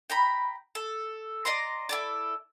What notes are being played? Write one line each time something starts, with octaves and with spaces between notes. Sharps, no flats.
G5 A#5 B5
A4
D5 D#5 A#5 C6
E4 A4 D5